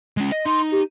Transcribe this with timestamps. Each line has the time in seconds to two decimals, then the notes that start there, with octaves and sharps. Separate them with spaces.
0.17 G#3 C#4
0.32 D#5
0.46 D#4 C6
0.72 G4